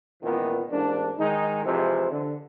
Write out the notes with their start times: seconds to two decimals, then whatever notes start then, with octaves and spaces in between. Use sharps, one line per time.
0.23 C#2 A#2 D#3 E3 B3
0.70 A1 G#2 A#3 D4
1.18 D#3 G#3 D#4
1.64 F2 C3 E3 G#3 C5
2.10 D3